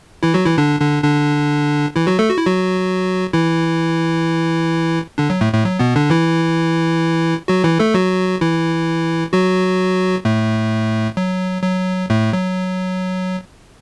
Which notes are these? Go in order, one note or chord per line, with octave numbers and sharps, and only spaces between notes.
E3 E4
F#3 F#4
E3 E4
D3 D4
D3 D4
D3 D4
E3 E4
F#3 F#4
A3 A4
F#4
E4
F#3 F#4
E3 E4
D3 D4
F#3
A2 A3
A2 A3
F#3
B2 B3
D3 D4
E3 E4
F#3 F#4
E3 E4
A3 A4
F#3 F#4
E3 E4
F#3 F#4
A2 A3
F#3
F#3
A2 A3
F#3